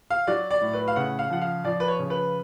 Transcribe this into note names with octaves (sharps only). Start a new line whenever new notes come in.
F5
F#3 D5
D5
A2
B4
F5
C#3 F#5
F5
F3 F#5
F5
F3 D5
B4
C#5
C#3
B4